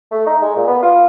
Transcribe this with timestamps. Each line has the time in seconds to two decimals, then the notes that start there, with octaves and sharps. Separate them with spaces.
0.12 A3
0.26 D#4
0.42 G#3
0.56 A#2
0.67 B3
0.83 F4